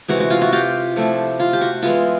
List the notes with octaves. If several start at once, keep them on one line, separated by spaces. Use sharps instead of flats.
C3 E3 G#3 F#4
F#4
F4
F#4
F4 G4
F3 A3 C4 E4
F4
G4
F#4
E3 G#3 B3 E4 F4